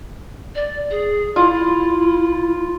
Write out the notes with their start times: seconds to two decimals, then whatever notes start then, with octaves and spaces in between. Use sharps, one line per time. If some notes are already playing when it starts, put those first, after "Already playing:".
0.55 D5
0.91 G#4
1.36 E4 F4